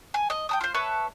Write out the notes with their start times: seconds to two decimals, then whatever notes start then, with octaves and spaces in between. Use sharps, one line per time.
0.14 G#5
0.30 D#5
0.49 G5 A5 D#6
0.61 F4 C5
0.74 B4 C#5 E5 A5